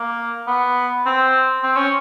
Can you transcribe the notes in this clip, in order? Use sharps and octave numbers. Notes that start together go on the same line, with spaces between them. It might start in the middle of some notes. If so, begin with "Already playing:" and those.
Already playing: A#3
B3
C4
C4
C#4